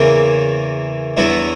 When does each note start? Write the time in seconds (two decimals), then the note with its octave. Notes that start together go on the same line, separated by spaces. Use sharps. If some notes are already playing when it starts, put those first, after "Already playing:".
Already playing: E2 C#3 E3 A#3
1.17 E2 D3 F#3 B3 E4